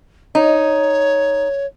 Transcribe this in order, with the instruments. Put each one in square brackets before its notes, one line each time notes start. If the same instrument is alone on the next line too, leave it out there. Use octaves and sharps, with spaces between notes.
[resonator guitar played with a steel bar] D#4 [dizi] C#5